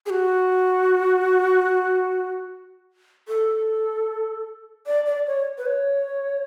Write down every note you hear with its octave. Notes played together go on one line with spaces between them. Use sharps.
G#4
F#4
A4
D5
D5
C#5
B4
C#5